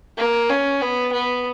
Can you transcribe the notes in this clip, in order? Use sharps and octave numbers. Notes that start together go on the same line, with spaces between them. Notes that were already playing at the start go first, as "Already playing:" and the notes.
A#3
C#4
B3
B3